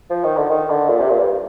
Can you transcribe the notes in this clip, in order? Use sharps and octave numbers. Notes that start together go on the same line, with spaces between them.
F3
D#3
D3
D#3
D3
A#2
C3
A#2
G2